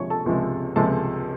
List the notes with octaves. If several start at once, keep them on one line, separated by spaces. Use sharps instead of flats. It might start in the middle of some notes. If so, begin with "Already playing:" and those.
Already playing: C#2 C3 F3 G#3 C#5 C#6
A4 A5
C#2 C3 F3 G#3
C#2 C3 F3 G#3 A4 A5